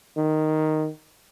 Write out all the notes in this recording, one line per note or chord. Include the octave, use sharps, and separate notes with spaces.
D#3